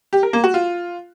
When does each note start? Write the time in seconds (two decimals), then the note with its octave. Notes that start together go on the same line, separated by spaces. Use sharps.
0.13 G4
0.23 A#4
0.33 A#3
0.44 F#4
0.54 F4